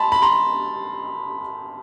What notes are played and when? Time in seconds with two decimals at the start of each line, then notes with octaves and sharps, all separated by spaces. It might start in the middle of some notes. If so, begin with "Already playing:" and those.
Already playing: A5 B5 C6
0.12 B5
0.22 A#5 C6